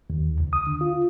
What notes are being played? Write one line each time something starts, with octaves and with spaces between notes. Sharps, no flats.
D#2
C#2
D#6
D3
F4